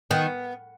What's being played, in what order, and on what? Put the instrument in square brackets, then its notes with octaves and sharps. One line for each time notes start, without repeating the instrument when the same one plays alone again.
[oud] D#3 [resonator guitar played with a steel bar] B3